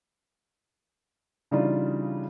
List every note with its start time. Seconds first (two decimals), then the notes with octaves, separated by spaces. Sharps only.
1.51 C#3 E3 G3 D4 D#4 F4